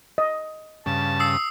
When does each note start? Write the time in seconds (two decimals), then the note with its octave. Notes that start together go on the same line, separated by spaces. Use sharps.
0.18 D#5
0.86 G2 C#3 A5
1.20 D#6 E6 C7